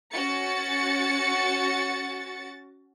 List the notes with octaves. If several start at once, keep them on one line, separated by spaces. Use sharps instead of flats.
C#4 F#4 A6 C#7